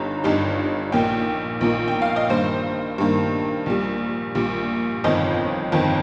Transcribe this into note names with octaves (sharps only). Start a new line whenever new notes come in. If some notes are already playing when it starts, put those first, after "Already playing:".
Already playing: G1 G2 D#4 A#5
G1 G2 G3 D#4
A#1 A#2 A#3 D#4 G5
A#1 A#2 A#3 D#4
G5
F5
D#5
G2 D#3 A#3 C5
G2 D#3 A#3
A#1 A#2 G3
A#1 A#2 G3
G1 F2 D#3 C4 D#5
G1 F2 D#3 C4